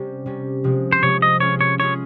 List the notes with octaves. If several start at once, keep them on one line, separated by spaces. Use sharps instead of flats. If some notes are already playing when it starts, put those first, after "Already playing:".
Already playing: C3 G3 C#4 G4
C3 G3 C#4
C3 F3 G#3
C5
C3 F3 G#3 C#5
D#5
G#3 C#4 F4 G#4 C#5
C#5
G#3 C#4 F4 G#4 C#5